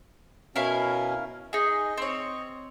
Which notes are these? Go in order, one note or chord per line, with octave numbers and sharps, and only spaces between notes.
B2 C#4 E4 A#4 F5
D#4 G#4 D#5
C4 C#5